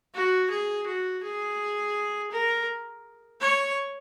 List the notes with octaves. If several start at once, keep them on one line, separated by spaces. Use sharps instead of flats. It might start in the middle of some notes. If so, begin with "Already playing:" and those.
F#4
G#4
F#4
G#4
A#4
C#5